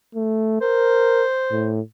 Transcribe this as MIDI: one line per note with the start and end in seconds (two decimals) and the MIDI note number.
0.15 0.60 57
0.61 1.25 70
0.61 1.72 72
1.51 1.80 45